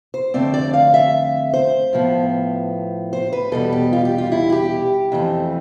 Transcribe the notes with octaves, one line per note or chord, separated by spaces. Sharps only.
C5
F2 D3 A3 C4 D5
D5
F5
E5
C5
A2 F3 B3
C5
B4
E2 B2 G3 A4
G4
F4
G4
F4
E4
G4
F2 E3 A3 C4